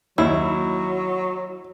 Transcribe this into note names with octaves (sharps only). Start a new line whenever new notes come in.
D#2 F#3 E4 E6